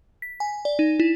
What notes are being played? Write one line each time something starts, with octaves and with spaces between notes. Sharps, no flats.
B6
G#5
D5
D#4
E4